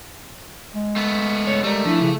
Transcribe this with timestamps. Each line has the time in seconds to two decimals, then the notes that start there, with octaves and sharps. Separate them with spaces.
0.75 G#3
0.96 A3 B3
1.47 C#2 G2 C#5
1.64 G3 A3 A#4
1.85 F3 D4 E4
2.01 C#3